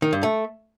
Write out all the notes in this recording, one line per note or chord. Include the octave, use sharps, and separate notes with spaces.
D#3
G2
A3